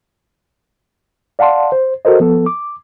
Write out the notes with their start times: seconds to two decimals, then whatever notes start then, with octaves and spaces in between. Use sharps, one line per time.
1.39 D5 F5 F#5 A5 C6
1.72 C5
2.05 F#4 A4 A#4 C5 D#5
2.20 F3 B3 A4
2.46 D6